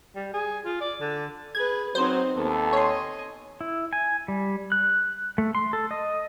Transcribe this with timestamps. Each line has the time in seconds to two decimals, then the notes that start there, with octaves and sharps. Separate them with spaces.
0.16 G3
0.34 G#4
0.65 F4
0.81 D5
1.00 D3
1.55 G#4 B4 G#6
1.95 F#3 C4 D#4 C5
2.36 D#2 B3 A4
2.73 C#5 D#5 G#5 C6
3.61 E4
3.93 G#5
4.28 G3
4.72 F#6
5.38 A3
5.55 C6
5.73 A4
5.91 D#5